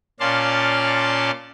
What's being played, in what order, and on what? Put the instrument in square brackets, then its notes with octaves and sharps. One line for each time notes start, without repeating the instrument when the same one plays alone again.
[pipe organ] A#2 C#4 D5 F5 A5 C6